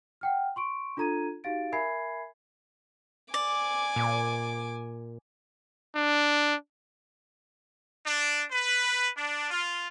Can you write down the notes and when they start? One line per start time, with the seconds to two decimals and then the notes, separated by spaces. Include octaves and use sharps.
0.21 F#5 G5 F6
0.56 C6 C#6 D7
0.97 D4 F4 A4 A#5 G#6 D#7
1.44 D#4 F#4 G4 F5 A6 D7
1.72 A#4 E5 G#5 B5 G#6 C7
3.34 D5 G#5 D6
3.96 A#2
5.95 D4
8.06 D4
8.51 B4
9.17 D4
9.50 F4